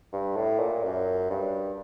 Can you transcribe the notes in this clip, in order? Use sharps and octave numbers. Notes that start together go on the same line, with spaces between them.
G2
A2
A#2
F#2
G2